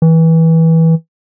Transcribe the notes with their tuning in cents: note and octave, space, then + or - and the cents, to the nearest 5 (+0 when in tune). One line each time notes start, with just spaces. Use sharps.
E3 -20